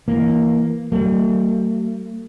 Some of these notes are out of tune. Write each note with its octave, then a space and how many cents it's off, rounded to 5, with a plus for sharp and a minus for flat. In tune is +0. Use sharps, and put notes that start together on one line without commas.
E3 +0 A#3 -5
F#3 +40 A3 +40